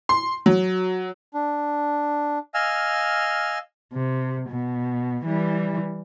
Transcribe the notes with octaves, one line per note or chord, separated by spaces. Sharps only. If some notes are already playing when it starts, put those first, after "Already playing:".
C6
F#3
D4
D#5 F5 G#5 E6 F6
C3
B2
E3 G3